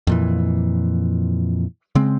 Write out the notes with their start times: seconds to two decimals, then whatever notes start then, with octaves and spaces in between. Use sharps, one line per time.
0.07 F2 A#2 E3
1.95 C#3 G#3 C4